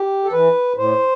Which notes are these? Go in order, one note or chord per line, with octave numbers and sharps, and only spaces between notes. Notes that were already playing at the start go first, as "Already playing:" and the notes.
Already playing: G4
A4
E3 B4
A2 C5